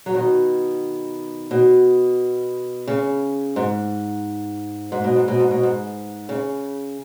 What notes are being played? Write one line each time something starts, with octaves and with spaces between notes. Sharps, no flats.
F#3
B2 D#3
B2
C#3
G#2
G#2
B2
G#2
B2
G#2
B2
G#2
C#3